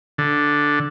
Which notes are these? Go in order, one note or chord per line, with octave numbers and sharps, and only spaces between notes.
D3